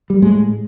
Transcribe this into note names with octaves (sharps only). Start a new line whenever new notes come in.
G3
A2 G#3